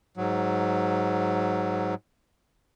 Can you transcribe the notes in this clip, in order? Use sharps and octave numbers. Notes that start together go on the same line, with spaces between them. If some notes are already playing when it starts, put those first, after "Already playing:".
G#2 F#3